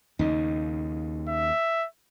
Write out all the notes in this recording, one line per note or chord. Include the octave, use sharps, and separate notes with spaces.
D#2 C#3 D#4
E5